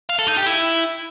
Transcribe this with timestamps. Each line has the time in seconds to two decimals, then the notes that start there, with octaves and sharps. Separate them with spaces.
0.09 F5
0.19 A4
0.28 D#4
0.37 G4
0.46 E4